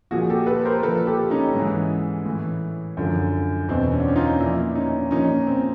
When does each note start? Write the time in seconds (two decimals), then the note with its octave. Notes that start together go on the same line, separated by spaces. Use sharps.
0.11 A#2 F3 F#4 G#4
0.30 G4 A4
0.47 A4 B4
0.65 A#4 C5
0.82 A#2 F3 A4 B4
1.07 G4 A4
1.30 C#4 D#4
1.54 G#2 E3 C#4
2.25 A2 E3
2.97 F#2 D3 F3
3.68 E2 B2 C4
3.92 C#4
4.00 D4
4.08 C#4
4.16 D#4 F4
4.40 A#2 F3 D4 E4
4.75 C#4 D#4
5.11 A#2 F3 C#4 D#4
5.47 C4